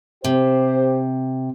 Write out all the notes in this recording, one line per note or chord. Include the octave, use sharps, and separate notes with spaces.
C3 G4 C5